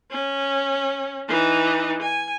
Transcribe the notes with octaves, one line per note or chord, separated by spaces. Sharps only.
C#4
E3 D#4
G#5